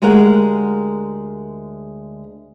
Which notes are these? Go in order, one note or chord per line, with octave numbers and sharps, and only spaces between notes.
D2 G#3 G4 A#4 F#5